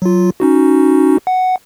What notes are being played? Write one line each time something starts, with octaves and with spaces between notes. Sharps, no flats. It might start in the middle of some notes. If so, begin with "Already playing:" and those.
F#3 F4
C#4 D#4 F#4
F#5